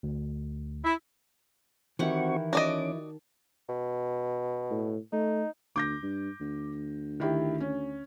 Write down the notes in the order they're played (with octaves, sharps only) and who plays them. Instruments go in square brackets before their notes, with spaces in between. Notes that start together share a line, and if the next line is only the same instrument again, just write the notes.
[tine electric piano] D2
[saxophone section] E4
[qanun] D#3 G4 F#5 [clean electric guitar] E3 E4 [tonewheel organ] C4 F#4 C#6
[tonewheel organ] C#4 D6 [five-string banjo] F#4 D5 D#5 [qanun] A5
[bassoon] B2
[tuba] A2
[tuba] A3 [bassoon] D#4
[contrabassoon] D2 [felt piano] D6 G6 A#6
[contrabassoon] G2
D2
[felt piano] D#3 E4 G4
C#4